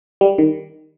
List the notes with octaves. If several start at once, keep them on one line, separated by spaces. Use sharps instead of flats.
G3
D#3